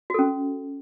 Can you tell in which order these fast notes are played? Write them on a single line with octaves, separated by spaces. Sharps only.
F#4 A4 C#4